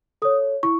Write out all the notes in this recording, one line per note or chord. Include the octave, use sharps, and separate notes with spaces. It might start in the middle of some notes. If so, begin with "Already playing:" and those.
A4 C#5 D#6
E4 C#6